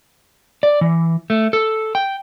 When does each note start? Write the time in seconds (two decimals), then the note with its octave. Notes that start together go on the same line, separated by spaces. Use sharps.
0.63 D5
0.81 E3
1.30 A3
1.53 A4
1.95 G5